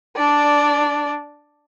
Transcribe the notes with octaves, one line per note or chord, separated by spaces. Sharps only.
D4 D5